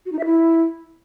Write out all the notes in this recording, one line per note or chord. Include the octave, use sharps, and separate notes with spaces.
F#4
D#4
E5
E4